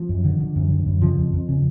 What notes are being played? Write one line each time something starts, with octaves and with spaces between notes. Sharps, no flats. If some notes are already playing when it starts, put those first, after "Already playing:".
Already playing: F3
F#2
D3
D3
F#2
D3
F#2
C#3 F3
F2
F2
C#3